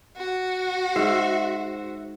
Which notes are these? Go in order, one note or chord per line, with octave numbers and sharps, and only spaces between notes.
F#4
G#2 C5 E5